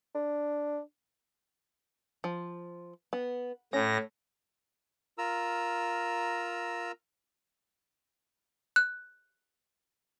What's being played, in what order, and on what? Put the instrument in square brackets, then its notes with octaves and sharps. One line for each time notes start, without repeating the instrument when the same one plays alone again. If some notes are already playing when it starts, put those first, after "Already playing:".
[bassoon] D4
[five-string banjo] F3
B3
[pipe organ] A2 A#6 [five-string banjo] C#4
[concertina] F4 A#4 A#5 E6
[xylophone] F#6